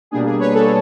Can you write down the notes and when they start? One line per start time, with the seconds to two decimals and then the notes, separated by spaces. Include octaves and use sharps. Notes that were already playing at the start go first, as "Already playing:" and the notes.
0.11 B2 G3 A#3 D4 G#4
0.25 G#4
0.40 B4 C#5
0.54 A4 B4